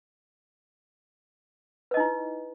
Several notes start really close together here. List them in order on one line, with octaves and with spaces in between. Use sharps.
B4 D#5 D#4 E4